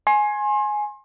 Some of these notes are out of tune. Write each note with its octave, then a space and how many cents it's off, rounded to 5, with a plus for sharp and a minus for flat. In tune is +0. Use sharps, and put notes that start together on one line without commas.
G#5 +10 C6 +35